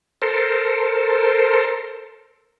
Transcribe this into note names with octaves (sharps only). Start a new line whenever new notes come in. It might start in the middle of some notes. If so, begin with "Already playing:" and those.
A4 A#4 C5